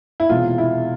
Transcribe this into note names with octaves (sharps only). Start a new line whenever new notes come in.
E4
E1 E2 C3 E3 F4
E4